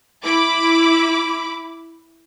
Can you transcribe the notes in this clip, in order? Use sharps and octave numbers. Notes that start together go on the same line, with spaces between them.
E4 B5 D6